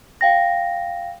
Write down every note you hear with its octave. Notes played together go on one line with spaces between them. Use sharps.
F5 G5 A#6